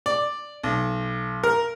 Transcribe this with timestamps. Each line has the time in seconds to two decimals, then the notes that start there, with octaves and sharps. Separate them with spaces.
0.06 D5
0.63 B1
1.44 A#4